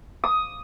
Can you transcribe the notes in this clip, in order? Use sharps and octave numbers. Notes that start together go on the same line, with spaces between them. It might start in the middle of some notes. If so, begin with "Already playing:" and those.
D#6